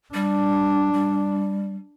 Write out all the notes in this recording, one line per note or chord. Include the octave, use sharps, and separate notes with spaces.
G3 D4
G3